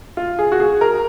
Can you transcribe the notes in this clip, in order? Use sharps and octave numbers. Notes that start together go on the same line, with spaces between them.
F4
G#4
F#4
G#4
A#4